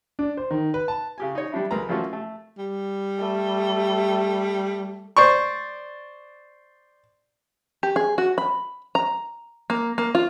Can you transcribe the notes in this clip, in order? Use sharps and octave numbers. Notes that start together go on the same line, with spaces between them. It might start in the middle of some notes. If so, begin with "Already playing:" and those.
D4
C5
D#3
B4
A5
C#3 G4 G#5
D#4 C#5
G3 D4 E4
C#2 A#4 B4 A#5
F3 A3 A#3 C#4 F4 F#4
A3
G3
A3
C5 D5 C#6
G4
G#4
F#4
B5
A#5
A#3
A#3
F4